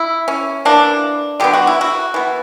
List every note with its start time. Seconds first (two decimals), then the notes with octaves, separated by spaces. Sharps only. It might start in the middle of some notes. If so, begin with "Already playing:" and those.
Already playing: E4
0.28 C#4
0.65 E3 A#3 D4
1.40 D3 F#3 B3 G4
1.54 F#4
1.67 E4
1.81 F#4
2.14 E3 B3